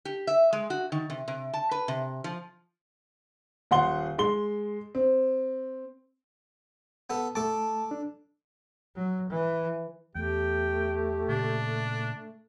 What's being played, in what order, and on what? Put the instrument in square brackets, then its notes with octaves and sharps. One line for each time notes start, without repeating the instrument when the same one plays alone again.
[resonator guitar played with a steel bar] G4
E5
G#3
F#4
D#3
C3
C3
A5
B4
C3
F3
[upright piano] D#1 F#5 C6 G7
G#3 C6 G7
C4
[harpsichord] B3 A4
[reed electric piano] A3 A5 [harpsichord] A4 D6
[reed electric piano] D4
[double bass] F#3
E3
[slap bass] E2 [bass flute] A3 [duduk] G4 [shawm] G5
[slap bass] A#2 C#3 [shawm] D4